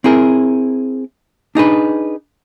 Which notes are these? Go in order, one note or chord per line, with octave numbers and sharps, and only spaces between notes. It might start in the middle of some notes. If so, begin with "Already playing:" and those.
C4 E4 G#4 A#4
D4 D#4 G#4 B4